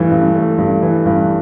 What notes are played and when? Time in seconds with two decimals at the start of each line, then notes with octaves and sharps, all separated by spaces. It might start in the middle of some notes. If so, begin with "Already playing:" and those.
Already playing: G2 E3 A3
0.12 G2
0.35 A3
0.58 G2
0.83 E3
1.06 G2